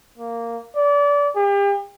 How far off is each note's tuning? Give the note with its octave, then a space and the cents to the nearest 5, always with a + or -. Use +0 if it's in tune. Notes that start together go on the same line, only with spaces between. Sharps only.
A#3 -5
D5 -30
G4 +40